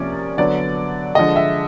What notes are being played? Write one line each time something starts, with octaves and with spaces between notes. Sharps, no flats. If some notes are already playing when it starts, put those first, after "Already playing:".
Already playing: C3 F3 A#3 C#4 D5
D3 F#3 B3 D5
D3 F3 G#3 D#5
E5